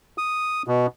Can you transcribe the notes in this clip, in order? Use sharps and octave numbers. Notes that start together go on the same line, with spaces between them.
D#6
B2